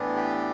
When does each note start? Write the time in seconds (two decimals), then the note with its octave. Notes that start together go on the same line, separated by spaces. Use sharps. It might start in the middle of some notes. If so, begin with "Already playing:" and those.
Already playing: A2 E3 B3 D4
0.15 G4